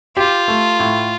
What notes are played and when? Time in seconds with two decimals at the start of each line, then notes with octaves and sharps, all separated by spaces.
0.17 F4 G4
0.48 A3
0.80 A2